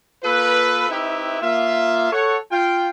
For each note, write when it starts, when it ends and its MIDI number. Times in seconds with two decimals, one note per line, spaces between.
0.23 0.87 58
0.23 0.87 65
0.23 0.87 69
0.23 0.87 71
0.89 1.39 60
0.89 1.39 63
0.89 1.39 64
0.89 1.39 67
0.89 1.39 71
0.89 1.39 76
1.41 2.09 58
1.41 2.09 65
1.41 2.09 76
2.12 2.36 69
2.12 2.36 73
2.12 2.36 78
2.51 2.89 65
2.51 2.89 79